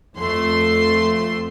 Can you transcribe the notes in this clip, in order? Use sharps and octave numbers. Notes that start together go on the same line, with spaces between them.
F2 A3 C6